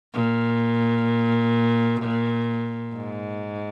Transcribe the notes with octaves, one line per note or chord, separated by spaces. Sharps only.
A#2
G#2